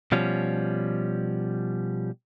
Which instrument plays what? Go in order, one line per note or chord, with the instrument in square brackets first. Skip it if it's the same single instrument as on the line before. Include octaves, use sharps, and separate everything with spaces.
[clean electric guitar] B2 F3 G3 C#4